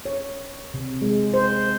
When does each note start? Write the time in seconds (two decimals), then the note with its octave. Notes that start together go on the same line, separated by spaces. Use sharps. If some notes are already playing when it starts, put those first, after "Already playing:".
0.05 C#5
0.74 C3
1.02 G#3
1.34 C5